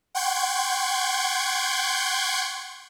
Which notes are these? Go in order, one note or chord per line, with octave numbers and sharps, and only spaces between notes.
F#5 G5 C6 C#6 G6 G#6